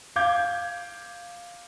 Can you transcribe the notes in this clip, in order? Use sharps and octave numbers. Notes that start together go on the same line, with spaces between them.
F5 D6 G6 G#6